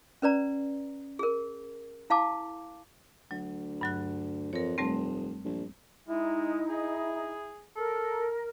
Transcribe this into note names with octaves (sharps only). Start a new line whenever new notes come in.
C#4 B4 D5 A#5
G#4 A#4
E4 F5 A5 D6
D2 F#3
G2 F#3 F#6
F2 A#4 C#5
F1 G3 A3 C4
A#1
G#3 D#4 E4
G#4
A4 A#4